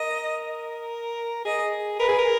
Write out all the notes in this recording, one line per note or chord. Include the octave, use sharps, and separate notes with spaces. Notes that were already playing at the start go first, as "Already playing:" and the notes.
Already playing: A#4 D#5
G#4 D#5
A#4 B4
G#4
A#4